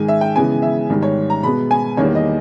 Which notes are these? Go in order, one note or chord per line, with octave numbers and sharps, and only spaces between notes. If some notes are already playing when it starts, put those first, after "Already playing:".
Already playing: G#2 D#3 G#3 G#5
E5
G5
C#3 E3 G#3 B3 G#5
E5
G#2 D#3 G3
C#5
A#5
B2 G#3 B3 B5
G#5
E2 D#3 G3 A#3 C#5
D#5